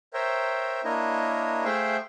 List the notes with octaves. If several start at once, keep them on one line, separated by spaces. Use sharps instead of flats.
A#4 C5 C#5 E5 G5
A#3 D4 E4 A#4 C#5 D#5
A3 G#4 C5 E5 F5 G5